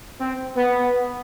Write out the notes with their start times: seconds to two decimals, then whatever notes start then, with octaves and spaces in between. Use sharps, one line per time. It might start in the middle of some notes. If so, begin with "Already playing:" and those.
0.20 C4
0.56 B3